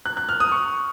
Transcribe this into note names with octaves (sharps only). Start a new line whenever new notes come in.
F#6
F#6
F6
D#6
C#6